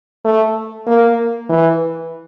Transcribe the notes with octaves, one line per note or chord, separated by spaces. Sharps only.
A3
A#3
E3